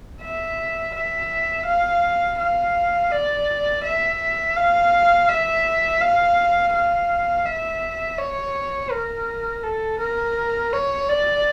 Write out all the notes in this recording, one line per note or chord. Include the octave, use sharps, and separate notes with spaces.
E5
E5
F5
F5
D5
E5
F5
E5
F5
F5
E5
C#5
A#4
A4
A#4
C#5
D5